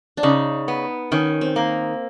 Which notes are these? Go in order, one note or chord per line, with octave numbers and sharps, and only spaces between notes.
D4
C#3 D#4
B3
D#3 C#4
C4
A#3